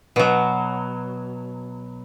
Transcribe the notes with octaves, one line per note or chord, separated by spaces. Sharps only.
B2 F#3